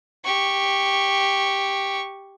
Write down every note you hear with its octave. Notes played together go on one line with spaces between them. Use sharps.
G4 C#6